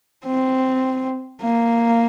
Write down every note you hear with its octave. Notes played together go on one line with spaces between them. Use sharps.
C4
A#3